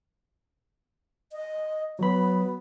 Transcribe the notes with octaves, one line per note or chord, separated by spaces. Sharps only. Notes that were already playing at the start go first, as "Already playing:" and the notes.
D#5
F#3 B3 B5